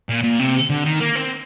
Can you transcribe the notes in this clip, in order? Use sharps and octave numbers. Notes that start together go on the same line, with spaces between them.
A#2
A#2
C3
D3
D#3
A#3
C4